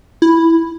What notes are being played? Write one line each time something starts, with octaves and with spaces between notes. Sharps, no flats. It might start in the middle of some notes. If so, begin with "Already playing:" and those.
E4